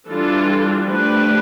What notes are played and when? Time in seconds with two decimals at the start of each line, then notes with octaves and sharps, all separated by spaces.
0.08 E3 G3 D4 F4 A4
0.86 F3 A3 D4 G4 B4